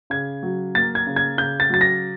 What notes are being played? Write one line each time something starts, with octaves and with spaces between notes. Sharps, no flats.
C#3 G#6
F#3
A#3 A6
G#6
C#3
G#6
C#3 G6
A6
F#3 A6
A#6